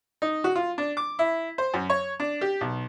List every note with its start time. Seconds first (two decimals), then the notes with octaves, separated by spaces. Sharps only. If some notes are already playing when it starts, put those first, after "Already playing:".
0.22 D#4
0.44 F#4
0.55 F4
0.78 D4
0.97 D6
1.19 E4
1.58 C5
1.74 F#2
1.90 C#5
2.20 D4
2.41 G4
2.61 B1